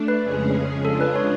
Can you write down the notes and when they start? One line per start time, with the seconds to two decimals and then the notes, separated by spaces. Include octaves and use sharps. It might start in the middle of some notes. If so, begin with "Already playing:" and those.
Already playing: A3 D4
0.08 B4
0.23 F2 C#3 G#3 C#4 G#4
0.84 C#3 G#3 D4 F4 G#4 A4
1.01 B4
1.16 C#5